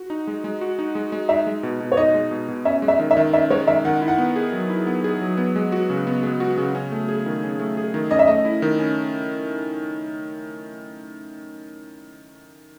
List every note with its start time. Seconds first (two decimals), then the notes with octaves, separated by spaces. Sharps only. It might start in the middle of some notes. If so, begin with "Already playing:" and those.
Already playing: F#4
0.10 D#4
0.27 G#3
0.44 G#3
0.61 F#4
0.79 D#4
0.95 G#3
1.12 G#3
1.29 D#4 E5
1.47 G#3
1.63 B2
1.80 B2
1.92 C#5
1.97 D#4 D#5
2.14 G#3
2.31 B2
2.48 B2
2.65 C#4 E5
2.82 G#3
2.88 E5
2.99 D#3
3.11 E5
3.17 D#3
3.33 C#4 E5
3.50 G#3 C#5
3.67 D#3 E5
3.85 D#3 F#5
4.02 E4
4.08 F#5
4.18 B3
4.36 G#4
4.52 F#3
4.70 E4
4.87 B3
5.04 G#4
5.21 F#3
5.38 B3
5.56 G#3
5.72 F#4
5.90 C#3
6.07 B3
6.23 G#3
6.40 F#4
6.57 C#3
6.75 C#4
6.92 A3
7.09 G#4
7.26 D#3
7.43 C#4
7.59 A3
7.77 G#4
7.94 D#3
8.11 C#4 D#5
8.19 E5
8.27 A3 D#5
8.45 E4
8.62 D#3
8.79 C#4